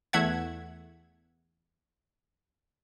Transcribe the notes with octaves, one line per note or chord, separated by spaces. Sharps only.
E2 A3 E5 F#5 G#6